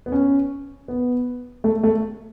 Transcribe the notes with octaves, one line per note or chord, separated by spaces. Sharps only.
B3
C#4
B3
A3
A3